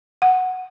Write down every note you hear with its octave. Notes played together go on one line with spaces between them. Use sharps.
F#5